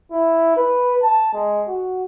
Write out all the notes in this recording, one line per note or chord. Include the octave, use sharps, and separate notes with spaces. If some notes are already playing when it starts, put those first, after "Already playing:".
E4
B4
A5
G#3
F#4